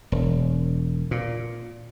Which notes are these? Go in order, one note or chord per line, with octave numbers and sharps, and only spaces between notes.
E1
A#2